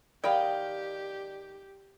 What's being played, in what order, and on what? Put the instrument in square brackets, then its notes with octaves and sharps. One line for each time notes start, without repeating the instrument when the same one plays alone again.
[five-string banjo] D#3 G5 B5 [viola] G4 [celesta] D5 [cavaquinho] D#5 F5